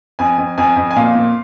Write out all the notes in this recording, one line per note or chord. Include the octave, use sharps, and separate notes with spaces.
F2 G#5
F2
F2 G#5
F2
G#5
A#2 F5
A#2